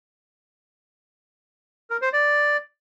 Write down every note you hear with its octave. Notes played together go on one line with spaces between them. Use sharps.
A#4
C5
D5